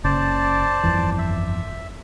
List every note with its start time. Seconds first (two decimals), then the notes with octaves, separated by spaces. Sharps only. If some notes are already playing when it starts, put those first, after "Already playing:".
0.04 F#1 C#3 C5 D5 A5
0.83 G1 F2 E3
1.18 E5